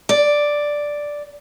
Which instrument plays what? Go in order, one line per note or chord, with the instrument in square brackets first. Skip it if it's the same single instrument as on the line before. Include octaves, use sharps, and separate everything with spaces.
[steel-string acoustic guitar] D5